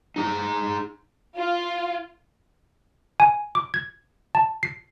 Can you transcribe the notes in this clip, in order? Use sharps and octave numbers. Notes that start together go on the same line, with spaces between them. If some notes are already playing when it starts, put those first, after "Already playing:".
D#4 G#4 A#5
F4
G#5
D6
G#6
A5
C7